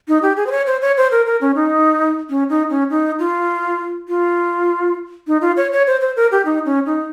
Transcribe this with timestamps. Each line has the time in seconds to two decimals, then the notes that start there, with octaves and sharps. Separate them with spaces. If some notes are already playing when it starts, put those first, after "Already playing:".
0.08 D#4
0.22 G4
0.37 G#4
0.47 C5
0.52 C#5
0.67 C5
0.82 C#5
0.97 C5
1.11 A#4
1.26 A#4
1.41 C#4
1.55 D#4
2.30 C#4
2.49 D#4
2.70 C#4
2.90 D#4
3.19 F4
4.09 F4
5.27 D#4
5.41 F4
5.57 C#5
5.72 C#5
5.87 C5
6.01 C5
6.16 A#4
6.32 G4
6.45 D#4
6.66 C#4
6.86 D#4